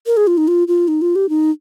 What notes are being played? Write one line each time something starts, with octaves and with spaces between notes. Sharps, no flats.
A#4
G#4
F4
D#4
F4
F4
D#4
F4
G4
D#4